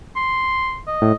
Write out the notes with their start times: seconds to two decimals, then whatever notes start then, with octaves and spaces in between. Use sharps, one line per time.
0.16 C6
0.87 D#5
1.02 A2